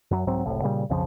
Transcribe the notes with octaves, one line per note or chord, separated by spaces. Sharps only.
F#2 F#3
C2 G#2 F#3 C4
F#1 C2 A2
A#2 C#3 G3
B1 F2 C#3 F3